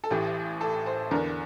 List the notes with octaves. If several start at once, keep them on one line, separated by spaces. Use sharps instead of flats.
A4
A1 A2 E3 G4
A4
C5
E2 D3 A#4